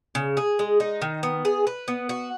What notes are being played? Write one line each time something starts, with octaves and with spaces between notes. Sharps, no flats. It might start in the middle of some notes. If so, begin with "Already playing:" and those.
C#3
G#4
G#3
D#4
D#3
B3
G#4
B4
B3
F#4